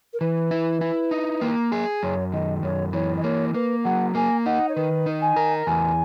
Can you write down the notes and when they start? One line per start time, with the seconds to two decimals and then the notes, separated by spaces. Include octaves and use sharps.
0.13 A#4
0.20 E3 B4
0.51 E4
0.81 E4
1.11 D#4
1.41 A#3
1.72 G#4
2.03 F#2 C#5
2.32 D#3 D#5
2.63 F#2 C#5
2.93 E3 C#5
3.17 D#5
3.24 A#3 C#5
3.54 A#3 B4
3.84 F#3 F#5
4.15 A#3 G#5
4.45 D#4 F#5
4.69 C#5
4.75 D#3 B4
5.06 D#4
5.22 G#5
5.36 A#4
5.67 E2 G#5